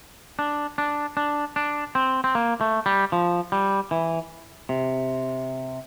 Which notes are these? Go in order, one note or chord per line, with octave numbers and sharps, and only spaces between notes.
D4
D4
D4
D4
C4
C4
A#3
A3
G3
F3
G3
E3
C3